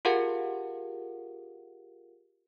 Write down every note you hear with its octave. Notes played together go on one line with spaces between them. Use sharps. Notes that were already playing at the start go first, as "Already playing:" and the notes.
F4 G4 G#4 A#4 F5 F#5